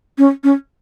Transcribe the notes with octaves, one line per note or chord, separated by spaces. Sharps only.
C#4
C#4